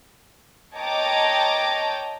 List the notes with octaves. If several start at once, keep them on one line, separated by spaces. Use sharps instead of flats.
C#5 D#5 G5 A5 A#5 D6